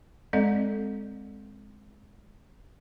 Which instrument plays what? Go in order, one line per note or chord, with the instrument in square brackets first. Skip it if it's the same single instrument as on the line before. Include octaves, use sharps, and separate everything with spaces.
[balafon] G#3 C4 A4 D5 D#5